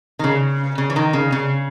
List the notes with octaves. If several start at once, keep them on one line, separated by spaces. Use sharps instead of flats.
D#3
C#3
C#3
E3
D#3
C#3
C#3